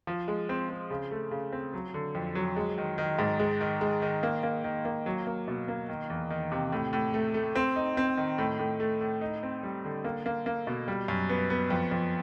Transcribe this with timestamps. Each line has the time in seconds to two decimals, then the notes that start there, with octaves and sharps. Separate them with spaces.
0.07 F3
0.28 G#3
0.49 C4
0.69 C4
0.90 C#3
1.11 A3
1.31 C#3
1.52 C4
1.74 F#3
1.94 D3
2.15 F2
2.35 F#3
2.56 G#3
2.78 D#3
2.98 D#3
3.19 G#2
3.39 G#3
3.61 D#3
3.81 G#3
4.02 D#3
4.23 A#3
4.43 A#3
4.64 D#3
4.85 A#3
5.06 F#3
5.27 A#3
5.48 B2
5.68 A#3
5.89 D#3
6.10 E2
6.30 D#3
6.52 C3
6.72 A2
6.93 A2
7.14 A3
7.34 A3
7.55 C4
7.76 D#4
7.97 C4
8.17 D#3
8.38 A2
8.59 A2
8.80 A3
9.01 A2
9.21 D#4
9.43 C4
9.63 G3
9.84 D3
10.04 A#3
10.26 A#3
10.46 A#3
10.67 B2
10.88 G3
11.08 F#2
11.29 B3
11.50 B3
11.70 F2
11.91 F2